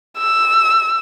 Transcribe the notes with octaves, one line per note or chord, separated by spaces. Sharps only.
E6